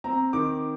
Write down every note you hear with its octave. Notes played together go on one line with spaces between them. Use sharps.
C4 A#5
D#3 D6